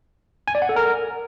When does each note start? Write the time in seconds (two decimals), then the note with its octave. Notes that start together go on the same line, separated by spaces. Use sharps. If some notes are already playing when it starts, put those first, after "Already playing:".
0.48 G#5
0.55 D5
0.62 F#5
0.69 A4
0.76 A#4